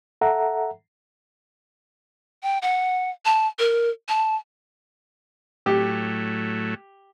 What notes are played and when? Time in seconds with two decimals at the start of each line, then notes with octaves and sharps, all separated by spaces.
0.21 A4 E5 F#5 A#5
2.43 G5
2.62 F#5
3.25 A5
3.59 A#4
4.09 A5
5.66 A2 F#3 A3 G4